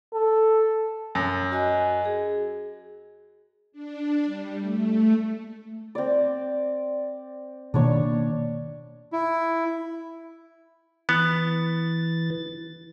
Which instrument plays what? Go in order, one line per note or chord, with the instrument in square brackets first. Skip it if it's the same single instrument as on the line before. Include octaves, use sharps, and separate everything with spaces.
[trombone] A4
[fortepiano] F#2
[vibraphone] F#4 D#5 G#5
G#4
[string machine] D4
G3
A3
[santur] C4 D5
[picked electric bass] B2 D#3 A#3 [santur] D4 C#5 C#6
[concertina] E4
[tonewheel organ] E3 A6 [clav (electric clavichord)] B3